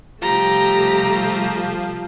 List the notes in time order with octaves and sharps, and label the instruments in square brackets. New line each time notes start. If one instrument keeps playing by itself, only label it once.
[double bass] C3 G3 [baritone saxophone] F3 [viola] A3 G4 [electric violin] A#5